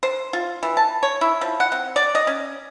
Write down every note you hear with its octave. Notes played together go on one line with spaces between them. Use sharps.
C5
F4
E3
A5
C#5
E4
F3
F#5
C4
D5
D#5
C#4